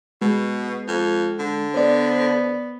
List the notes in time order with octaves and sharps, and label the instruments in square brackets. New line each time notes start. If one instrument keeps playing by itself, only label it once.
[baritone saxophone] B2 [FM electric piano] G#3
[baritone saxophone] F2
D3
[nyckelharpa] B3 [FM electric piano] C5 D5